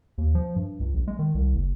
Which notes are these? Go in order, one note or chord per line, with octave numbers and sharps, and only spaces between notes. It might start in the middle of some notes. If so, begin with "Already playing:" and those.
D#2
F3
G2
C#2
A#1
G#3
D#3
C2
F#1